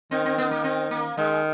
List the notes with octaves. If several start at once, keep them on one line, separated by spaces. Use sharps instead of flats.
D#3 C4
C4
B3
A#3
C4
A#3
D#3 G#3